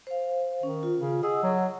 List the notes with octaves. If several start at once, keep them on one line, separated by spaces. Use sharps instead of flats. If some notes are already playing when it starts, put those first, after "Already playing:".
C5 F5
D#3 C#4
F4
C#3
G#4 D#5 F#5 E6
F#3